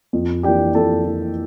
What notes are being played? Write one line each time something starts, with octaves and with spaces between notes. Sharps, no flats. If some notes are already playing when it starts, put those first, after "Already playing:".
F2
E3 A#3 D4 G4 G5
F2 A4 A5
E3 A#3 D4